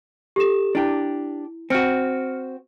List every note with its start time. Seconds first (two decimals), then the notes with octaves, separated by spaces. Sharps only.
0.36 G4 A4 E7
0.75 D4 E4 G4
1.70 C4 F#4 F6 C#7